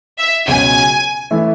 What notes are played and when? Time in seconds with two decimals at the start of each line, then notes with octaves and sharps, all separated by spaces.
0.19 E5
0.46 C#2 B2 F#3 C#4 F#4 G#5
1.31 E3 A3 E4 A4